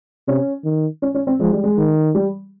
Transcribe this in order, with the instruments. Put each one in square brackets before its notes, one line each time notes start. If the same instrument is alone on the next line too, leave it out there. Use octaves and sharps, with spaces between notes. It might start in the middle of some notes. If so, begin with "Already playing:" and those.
[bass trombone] C3 [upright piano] C#4
[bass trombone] D#3
[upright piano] C#4
C#4
C4
[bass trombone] F3 [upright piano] G#3
[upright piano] G3
G#3
[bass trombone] D#3
[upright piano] G3